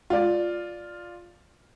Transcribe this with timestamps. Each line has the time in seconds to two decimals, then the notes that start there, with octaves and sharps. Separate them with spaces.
0.10 F4 D5